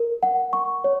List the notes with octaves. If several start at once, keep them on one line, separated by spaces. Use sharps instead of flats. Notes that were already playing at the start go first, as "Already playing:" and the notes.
Already playing: A#4
F#5
C#6
C#5